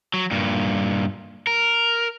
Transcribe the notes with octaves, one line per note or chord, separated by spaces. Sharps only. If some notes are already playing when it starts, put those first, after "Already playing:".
F#3
G2 A#2
A#4